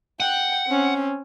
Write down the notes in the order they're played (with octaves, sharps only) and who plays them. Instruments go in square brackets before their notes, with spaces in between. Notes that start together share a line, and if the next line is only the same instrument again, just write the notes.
[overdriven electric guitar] F#5 [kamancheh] G5
[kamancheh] C4 C#4